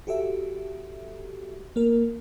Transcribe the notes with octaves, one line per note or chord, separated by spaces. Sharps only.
F#4 G4 A4 E5
A#3 A#4